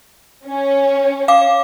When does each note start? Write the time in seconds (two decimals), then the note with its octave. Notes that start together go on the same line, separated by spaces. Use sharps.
0.46 C#4
1.28 F5 D6